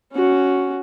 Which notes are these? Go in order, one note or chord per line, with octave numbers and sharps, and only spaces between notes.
C#4 F#4